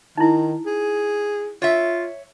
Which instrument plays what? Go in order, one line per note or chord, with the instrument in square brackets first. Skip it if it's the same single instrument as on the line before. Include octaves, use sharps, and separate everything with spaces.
[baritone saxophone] D#3 [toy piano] D#4 E4
[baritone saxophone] G#4
[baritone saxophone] F4 [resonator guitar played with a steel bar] C#5 E5